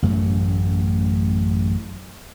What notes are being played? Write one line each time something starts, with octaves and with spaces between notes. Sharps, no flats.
A1 F#2 A3